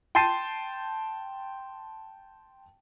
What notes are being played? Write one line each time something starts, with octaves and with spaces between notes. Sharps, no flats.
G5 A5 C6 A6 C7 D#7